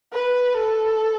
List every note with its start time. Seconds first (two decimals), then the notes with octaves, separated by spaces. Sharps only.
0.13 B4
0.57 A4